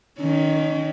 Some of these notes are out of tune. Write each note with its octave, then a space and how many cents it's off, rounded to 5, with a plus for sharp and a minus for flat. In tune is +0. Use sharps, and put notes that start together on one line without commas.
D#3 +0 C#4 +30